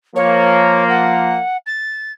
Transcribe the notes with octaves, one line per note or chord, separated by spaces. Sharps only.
F3 A#3 C#5
F#5
A6